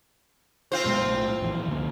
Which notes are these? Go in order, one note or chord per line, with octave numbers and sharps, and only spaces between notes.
C4 F4 C5
F#2 B2 G#3
B1 A2
A#1 F2 E3
C#2 D3 A#3